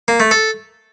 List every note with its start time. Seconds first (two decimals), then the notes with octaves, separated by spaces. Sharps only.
0.08 A#3
0.20 A3
0.31 A4